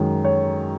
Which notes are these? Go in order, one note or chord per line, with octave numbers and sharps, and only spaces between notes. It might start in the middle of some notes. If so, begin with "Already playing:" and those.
Already playing: F#2 D#3 G#3
C#5